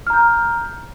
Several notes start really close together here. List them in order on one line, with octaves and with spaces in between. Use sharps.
F6 A#5 G6